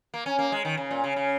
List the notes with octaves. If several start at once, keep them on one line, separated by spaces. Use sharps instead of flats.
A#3
C#4
A#3
G#3
D#3
C#3
A#2
C#3
C#3